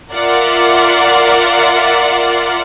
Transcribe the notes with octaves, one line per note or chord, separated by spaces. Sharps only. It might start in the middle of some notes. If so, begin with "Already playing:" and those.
F4 A#4 D5 E5 F#5 C6